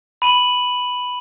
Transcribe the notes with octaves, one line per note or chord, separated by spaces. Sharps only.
B5 D#7 F#7